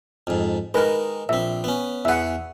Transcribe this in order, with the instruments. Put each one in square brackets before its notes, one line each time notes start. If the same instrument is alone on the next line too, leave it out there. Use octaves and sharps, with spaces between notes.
[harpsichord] F2 G#2
[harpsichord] D#3 G#3 [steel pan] A#4 B4
[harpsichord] A#1 C4 [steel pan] E5
[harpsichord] B3 C#4
[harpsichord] E2 G#4 [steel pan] E5 F#5